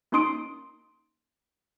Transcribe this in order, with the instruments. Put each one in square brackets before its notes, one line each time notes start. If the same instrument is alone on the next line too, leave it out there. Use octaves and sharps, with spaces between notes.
[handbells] A#3 C#4 D#4 C6 D#6 D7